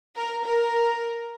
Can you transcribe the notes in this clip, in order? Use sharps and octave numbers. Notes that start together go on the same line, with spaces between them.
A#4
A#4